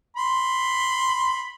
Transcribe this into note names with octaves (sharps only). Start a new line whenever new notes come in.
B5 C6